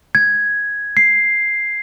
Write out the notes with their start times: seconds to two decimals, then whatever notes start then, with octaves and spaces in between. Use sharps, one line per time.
0.15 G#6
0.97 C7